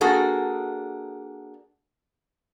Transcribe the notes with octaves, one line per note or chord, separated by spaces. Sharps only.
A#3 D4 F#4 G#4 A4